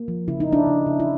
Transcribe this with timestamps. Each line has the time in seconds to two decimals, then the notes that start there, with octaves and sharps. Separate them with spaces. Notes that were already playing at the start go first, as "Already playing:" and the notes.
Already playing: A#3
0.08 F3
0.28 C#3 E4
0.40 D#4
0.48 C#3 D4 E4
0.67 C#3
0.87 C#3
1.00 E4